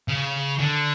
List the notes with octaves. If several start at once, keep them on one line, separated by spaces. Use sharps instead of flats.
C#3
D3